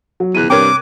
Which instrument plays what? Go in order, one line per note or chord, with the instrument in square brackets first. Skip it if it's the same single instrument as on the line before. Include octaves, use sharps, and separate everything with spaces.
[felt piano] F#3
[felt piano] D#1 F#6 D#7 [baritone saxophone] E2
[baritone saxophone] G2 [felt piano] C3 G#6 [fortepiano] A#4 C#5 G5 [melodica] D6